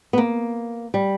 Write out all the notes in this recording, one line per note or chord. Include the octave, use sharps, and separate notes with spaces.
B3
A#3
G3